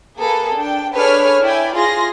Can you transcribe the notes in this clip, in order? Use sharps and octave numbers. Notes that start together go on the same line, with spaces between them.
A#3 G#4 A4 B4
D4 G5
D4 G#4 A4 B4 C#5 F6
E4 D5 G5 G#5
F4 G#4 C6 A#6